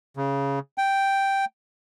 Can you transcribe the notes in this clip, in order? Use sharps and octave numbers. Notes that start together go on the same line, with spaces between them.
C#3
G5